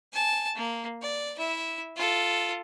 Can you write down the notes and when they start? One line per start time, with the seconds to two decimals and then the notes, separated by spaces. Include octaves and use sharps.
0.13 G#5 A5
0.55 A#3
1.02 D5
1.37 E4 E5
1.96 F4 A4